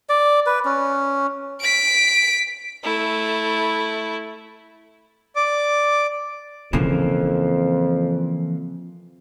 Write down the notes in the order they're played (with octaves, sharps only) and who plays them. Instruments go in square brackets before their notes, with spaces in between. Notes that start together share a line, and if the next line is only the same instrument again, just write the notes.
[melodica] D5
B4
C#4
[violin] B6 D7
[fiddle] A3 E4
[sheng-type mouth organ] D5 D6
[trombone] F2 [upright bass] C#3 C4 [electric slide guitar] E3 F3 A#3